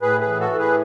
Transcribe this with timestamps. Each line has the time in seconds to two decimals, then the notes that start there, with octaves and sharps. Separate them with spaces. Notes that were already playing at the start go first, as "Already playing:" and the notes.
0.02 A2 G#4 B4
0.21 G#4 B4
0.27 E3
0.39 F#4 A4
0.52 A2
0.59 G#4 B4